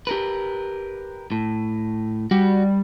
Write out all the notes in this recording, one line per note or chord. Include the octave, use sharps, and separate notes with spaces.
G4 A#4 B4
A2
G3 F#4